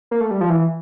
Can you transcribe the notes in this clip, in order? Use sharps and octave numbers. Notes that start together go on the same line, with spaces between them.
A#3
A3
G3
F3
E3